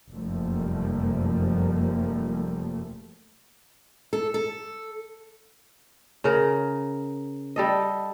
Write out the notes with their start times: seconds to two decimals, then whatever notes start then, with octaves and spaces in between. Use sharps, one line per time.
0.11 F1 F#2 F3 G3 A3 A#3
4.13 A4
4.34 A4
6.24 C#3 A#4
7.56 G3 A4 D#5